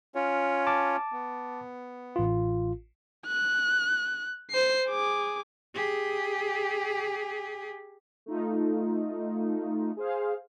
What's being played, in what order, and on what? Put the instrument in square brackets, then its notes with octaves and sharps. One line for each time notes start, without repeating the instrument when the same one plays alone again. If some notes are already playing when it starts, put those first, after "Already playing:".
[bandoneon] C#4 F4 C#5
[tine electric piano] A5 D6
[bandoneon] B3
[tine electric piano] A1 F4
[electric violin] F#6
C5 C7
G#4 D6
[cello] G4 G#4
[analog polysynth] A3 D#4 F4
G#4 C5 F5